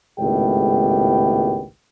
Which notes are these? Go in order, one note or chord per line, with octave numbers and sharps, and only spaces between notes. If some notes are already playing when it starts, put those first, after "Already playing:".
G#1 C#2 A2 B3 G4 G5